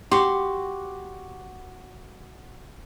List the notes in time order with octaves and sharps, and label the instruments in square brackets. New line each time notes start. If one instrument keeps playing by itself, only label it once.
[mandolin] F#4 C6 [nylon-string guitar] G4